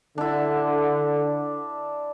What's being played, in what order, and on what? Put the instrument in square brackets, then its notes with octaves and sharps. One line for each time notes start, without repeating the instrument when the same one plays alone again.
[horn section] D3 [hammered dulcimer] D4 E4